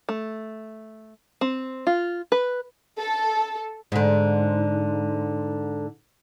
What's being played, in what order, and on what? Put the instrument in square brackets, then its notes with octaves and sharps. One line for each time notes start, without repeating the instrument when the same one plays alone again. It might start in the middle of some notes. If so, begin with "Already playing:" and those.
[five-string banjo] A3
C4
F4
B4
[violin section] A4
[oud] G#2 D3